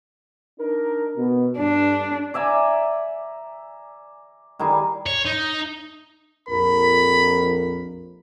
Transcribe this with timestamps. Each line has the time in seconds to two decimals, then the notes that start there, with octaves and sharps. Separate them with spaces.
0.60 D4 D#4 A#4
1.17 B2
1.58 G2 D4
2.34 D5 E5 G#5 A#5
4.59 D#3 G3 D#4 G#4
5.07 C#5
5.26 D#4
6.49 A#1 F2 A#4 B5